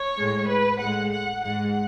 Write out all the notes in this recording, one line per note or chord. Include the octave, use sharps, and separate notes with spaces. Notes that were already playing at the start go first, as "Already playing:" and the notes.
Already playing: C#5
A2 G#3
B4
A2 G#3 F#5
F#5
G#2 G#3 F#5